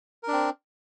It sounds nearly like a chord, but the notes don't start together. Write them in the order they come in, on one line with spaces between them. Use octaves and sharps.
A#4 D4 C4